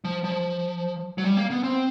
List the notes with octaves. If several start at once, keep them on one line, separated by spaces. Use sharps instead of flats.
F3
F3
F#3
G3
A#3
B3
C4